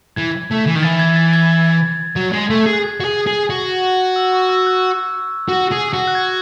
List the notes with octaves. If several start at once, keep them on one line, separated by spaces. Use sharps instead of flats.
E3 G#6
A3
E3
D#3
E3 A6
G#6
A6
G#6
F#3
G#3
A3
G#4
F#6
G#6
F#4
G#4
G#4
F#4
E6
C#6
E6
F#6
F#4
G#4
F#4
F#6
G#6